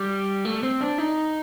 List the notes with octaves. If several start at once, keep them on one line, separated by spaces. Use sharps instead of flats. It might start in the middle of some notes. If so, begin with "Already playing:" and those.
Already playing: G3
A3
C4
D4
D#4